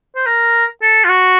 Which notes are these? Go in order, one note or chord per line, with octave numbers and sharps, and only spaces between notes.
C5
A#4
A4
F4
F#4